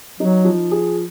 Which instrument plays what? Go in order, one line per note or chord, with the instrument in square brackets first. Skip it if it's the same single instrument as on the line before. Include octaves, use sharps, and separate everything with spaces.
[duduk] F#3 [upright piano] D#4
[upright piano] F3
G#4